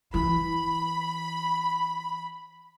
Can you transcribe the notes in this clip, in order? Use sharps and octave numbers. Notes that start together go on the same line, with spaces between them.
E3 B5